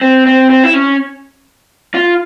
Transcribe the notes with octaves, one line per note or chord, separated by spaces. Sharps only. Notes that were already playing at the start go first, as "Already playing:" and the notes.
C4
C4
C4
E4
C#4
F4